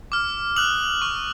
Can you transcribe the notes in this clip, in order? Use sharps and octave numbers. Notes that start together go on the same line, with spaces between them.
D6 F6
D#6 F#6 F#7
C#6 F6